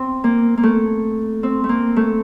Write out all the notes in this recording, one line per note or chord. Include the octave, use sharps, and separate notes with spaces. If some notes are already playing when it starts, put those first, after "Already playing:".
Already playing: C4
A#3
A#3
A3
C4
A3
A#3
A3